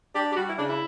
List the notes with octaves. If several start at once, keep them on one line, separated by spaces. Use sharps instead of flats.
D4 G4
G4
G3 F#4
E4
C#3 D4
E4